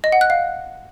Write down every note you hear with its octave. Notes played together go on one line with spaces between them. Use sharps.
D#5
F#5
F#6
F5